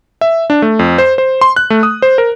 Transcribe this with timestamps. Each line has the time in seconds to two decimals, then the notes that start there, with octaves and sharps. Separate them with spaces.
0.21 E5
0.50 D4
0.62 A3
0.79 F2
0.98 C5
1.18 C5
1.41 C6
1.56 F#6
1.70 A3
1.83 D#6
2.02 C5
2.18 A#4